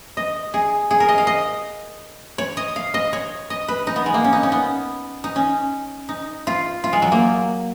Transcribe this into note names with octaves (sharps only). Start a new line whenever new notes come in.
D#5
G#4
G#4
A#4
D#5
F5
D#5
C#5
D#5
F5
D#5
C#5
D#5
B4
D#4
B3
G#3
A#3
C#4
D#4
C#4
B3
D#4
C#4
D#4
F4
F4
G#3
F#3
A#3